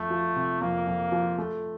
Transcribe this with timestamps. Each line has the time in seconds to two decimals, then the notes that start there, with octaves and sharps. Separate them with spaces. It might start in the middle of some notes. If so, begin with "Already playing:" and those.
Already playing: F2 A3
0.10 F3
0.36 C3
0.61 F2 A#3
0.87 F2
1.12 F3
1.38 A3